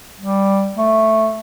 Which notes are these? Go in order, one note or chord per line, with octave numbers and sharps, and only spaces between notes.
G3
A3